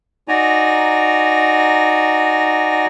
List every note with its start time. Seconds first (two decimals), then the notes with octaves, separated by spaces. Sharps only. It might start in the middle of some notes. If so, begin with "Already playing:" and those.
0.28 D#4 F#4 D5 G#5 A#5